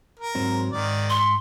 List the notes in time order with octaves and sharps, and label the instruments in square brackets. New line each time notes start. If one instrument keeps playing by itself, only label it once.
[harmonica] A#4
[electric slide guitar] G#2 F#3 C4
[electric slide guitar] G#2 [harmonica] D#3 D5
[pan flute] C6